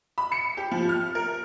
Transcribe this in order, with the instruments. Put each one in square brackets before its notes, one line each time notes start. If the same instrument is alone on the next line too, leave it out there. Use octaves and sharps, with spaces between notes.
[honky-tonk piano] B5
C#7
G4
F3
F6
A#4